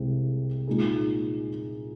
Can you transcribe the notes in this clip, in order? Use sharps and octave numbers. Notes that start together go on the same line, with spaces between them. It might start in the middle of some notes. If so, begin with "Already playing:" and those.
Already playing: C2 C3 G#3 C4
A#2 G#3 D#4 G#4